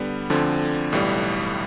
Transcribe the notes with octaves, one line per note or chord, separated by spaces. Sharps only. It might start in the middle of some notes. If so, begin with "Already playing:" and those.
Already playing: D3 G3 B3
D2 D3 F3 C4
B1 A2 E3 G3